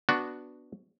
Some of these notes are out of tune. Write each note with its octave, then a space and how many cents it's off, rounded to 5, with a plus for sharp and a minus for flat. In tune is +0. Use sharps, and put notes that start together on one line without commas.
B3 +0 D4 +0 F#4 +0